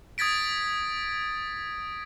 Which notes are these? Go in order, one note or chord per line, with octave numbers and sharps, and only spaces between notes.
D#6 G#6 A6 B6 D7